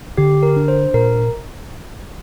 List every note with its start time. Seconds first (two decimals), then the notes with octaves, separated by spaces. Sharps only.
0.17 D3 G4
0.43 A#4
0.56 D4
0.68 C5
0.94 A#2 A#4